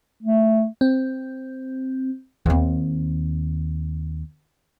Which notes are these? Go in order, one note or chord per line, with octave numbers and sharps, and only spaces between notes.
A3
C4
D#2 C4